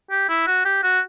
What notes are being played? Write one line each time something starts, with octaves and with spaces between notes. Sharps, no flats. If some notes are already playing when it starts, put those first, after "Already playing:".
G4
E4
F#4
G4
F#4